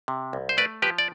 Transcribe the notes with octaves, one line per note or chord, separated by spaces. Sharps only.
C3
C2
C5
A3 B4 D5
F3 G4 B4
D5